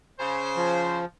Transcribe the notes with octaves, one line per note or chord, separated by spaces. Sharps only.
C#3 C5
F3